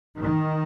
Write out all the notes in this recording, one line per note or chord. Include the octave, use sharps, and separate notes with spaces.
D#3